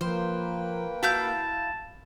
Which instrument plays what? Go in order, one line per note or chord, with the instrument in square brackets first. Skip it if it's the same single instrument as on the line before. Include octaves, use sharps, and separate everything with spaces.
[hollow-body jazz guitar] F3 [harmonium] A#3 B4 G5 [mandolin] C5
[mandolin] E4 F5 G6 [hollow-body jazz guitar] F#4 [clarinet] A5